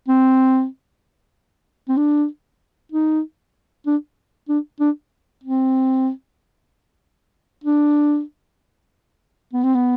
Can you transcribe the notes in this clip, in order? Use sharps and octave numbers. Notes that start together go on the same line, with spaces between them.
C4
C4
D4
D#4
D4
D4
D4
C4
D4
B3
C4
B3